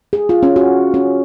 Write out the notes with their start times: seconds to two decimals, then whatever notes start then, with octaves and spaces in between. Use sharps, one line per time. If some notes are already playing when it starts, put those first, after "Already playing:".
0.13 G#4
0.29 F4
0.43 C#4
0.56 F#4
0.94 C#4